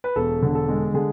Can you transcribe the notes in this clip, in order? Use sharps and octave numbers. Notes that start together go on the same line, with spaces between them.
B4
E1 A4
D3
A4
G#3
D3 G#4